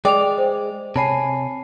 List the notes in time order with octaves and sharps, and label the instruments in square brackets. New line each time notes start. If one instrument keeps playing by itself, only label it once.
[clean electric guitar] G#3 [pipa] D5 [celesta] G5 F7
[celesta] C5
[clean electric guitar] C3 C#5 G#5 [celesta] A5 B5 C7